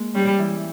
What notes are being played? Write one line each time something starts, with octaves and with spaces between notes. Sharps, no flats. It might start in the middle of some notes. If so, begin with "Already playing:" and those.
Already playing: G#3 A#3
G3 C#4
E3